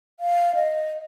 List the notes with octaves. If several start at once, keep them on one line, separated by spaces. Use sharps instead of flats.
F5
D#5